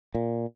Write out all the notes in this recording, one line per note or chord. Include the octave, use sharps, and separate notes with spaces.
A#2